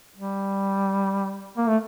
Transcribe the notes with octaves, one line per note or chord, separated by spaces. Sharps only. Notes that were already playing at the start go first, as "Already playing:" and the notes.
G3
A#3
A3